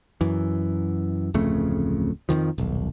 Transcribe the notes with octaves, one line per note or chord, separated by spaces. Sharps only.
F#2 E3
D1 F2 C#3 A3
F2 A2 D#3 F3
D#1 B1